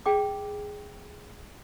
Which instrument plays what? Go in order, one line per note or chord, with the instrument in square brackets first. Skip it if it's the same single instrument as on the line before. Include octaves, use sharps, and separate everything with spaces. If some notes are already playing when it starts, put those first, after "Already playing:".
[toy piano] G#4 G5 D6